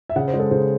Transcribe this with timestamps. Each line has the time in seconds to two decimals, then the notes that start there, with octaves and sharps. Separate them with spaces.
0.09 E5
0.16 C#3 F#5
0.27 C5
0.33 G#3
0.39 A4
0.51 C#3 C5